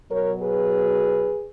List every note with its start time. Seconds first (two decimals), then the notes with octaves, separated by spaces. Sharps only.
0.10 B2 F#3 A#4 C#5
0.41 G#4 B4